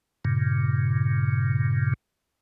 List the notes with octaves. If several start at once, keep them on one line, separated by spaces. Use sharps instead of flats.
G2 A#2 C#3